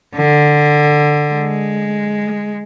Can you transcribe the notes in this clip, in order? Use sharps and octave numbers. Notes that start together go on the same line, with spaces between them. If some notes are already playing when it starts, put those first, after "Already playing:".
D3
G#3